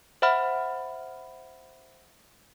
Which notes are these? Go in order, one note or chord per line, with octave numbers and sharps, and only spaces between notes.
C5 E5 F#5 B5 F6